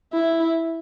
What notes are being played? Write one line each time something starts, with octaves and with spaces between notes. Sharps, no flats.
E4